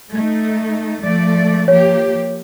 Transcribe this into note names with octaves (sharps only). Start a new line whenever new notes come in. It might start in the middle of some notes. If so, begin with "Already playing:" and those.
A3 D#4
F3 A3 D5
F3 A#3 G4 C#5